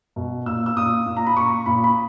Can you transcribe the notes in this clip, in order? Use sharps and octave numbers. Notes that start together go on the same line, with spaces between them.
B2
A#2 E6
E6
A#2 D#6
A#2
A#5
B5
A#2 C#6
A#2 B5
B5